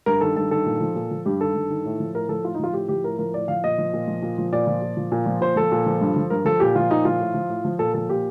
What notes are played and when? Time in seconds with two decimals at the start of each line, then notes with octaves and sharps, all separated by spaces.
0.06 G2 A#4
0.21 D#3 A4
0.36 G2 A4
0.51 D#3 A4
0.66 A#2
0.80 F3
0.95 A#2
1.11 F3
1.25 G2 G4
1.40 D#3 A4
1.55 G2
1.70 D#3
1.85 A2
2.00 F3
2.14 A2 A#4
2.29 F3 A4
2.44 A2 F4
2.55 D#4
2.59 F3 F4
2.73 A2 G4
2.88 F3 G4
3.04 A2 A#4
3.19 F3 A#4
3.34 A2 D5
3.48 F3 F5
3.64 A#2 D#5
3.78 F3
3.93 A#2
4.08 F3
4.22 A#2
4.38 F3
4.52 A#2 D5
4.67 F3
4.82 A#2
4.97 F3
5.12 A#2
5.26 F3
5.41 A#2 C5
5.56 F3 A4
5.72 A#2
5.86 F3
6.01 G2
6.16 F3
6.30 G2 A#4
6.45 F3 A4
6.60 A#2 G4
6.75 F3 F4
6.91 A#2 D#4
7.05 F3 F4
7.20 A2
7.34 F3
7.49 A2
7.65 F3
7.79 A#2 A4
7.94 F3 A4
8.09 A#2 G4